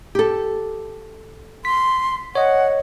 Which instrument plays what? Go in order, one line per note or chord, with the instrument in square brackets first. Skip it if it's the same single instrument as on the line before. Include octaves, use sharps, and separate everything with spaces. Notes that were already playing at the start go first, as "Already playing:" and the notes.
[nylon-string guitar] G4 A4
[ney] C6 [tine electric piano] B6
[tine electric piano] C#5 D#5 [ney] F#5